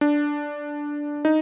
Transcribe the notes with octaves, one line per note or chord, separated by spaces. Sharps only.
D4
D#4